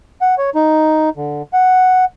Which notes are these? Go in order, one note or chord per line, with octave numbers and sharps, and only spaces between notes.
F#5
C#5
D#4
D3
F#5